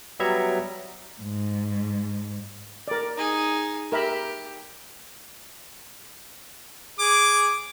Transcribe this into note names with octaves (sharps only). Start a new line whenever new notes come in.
F#3 G3 B3 E5 A#5 G#6
G#2
A#4 D5
D#4 G#4
G4 A#4 E5 B5
G#4 D6